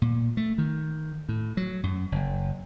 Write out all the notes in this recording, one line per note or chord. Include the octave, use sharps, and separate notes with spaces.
A#2
A3
D#3
A2
F#3
F#2
F#1